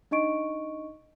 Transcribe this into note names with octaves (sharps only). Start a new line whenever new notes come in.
D4 D#4 D#5 C#6 D7